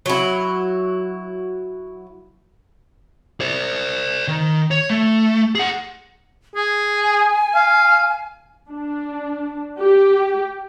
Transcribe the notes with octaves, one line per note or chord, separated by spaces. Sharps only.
F#3 E4
C5 D5
D#3
C#5
A3
G#4 F#5
G#4 G#5
F5
D4
G4